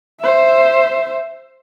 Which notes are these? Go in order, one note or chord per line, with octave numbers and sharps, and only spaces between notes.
C5 E5